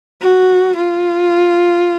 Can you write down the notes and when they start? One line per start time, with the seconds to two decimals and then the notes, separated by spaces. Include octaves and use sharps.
0.21 F#4
0.76 F4